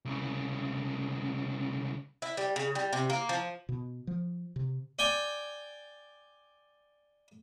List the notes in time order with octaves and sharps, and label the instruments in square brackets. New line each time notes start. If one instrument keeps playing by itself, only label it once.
[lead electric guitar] C2 C#3
[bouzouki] E4
G3
C#3
G3
C3
A#3
F3
[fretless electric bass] B2
F3
C3
[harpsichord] D5 G5 G#5 D6